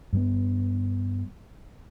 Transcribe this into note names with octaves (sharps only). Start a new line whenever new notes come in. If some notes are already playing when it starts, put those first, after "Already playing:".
G2 G3 B3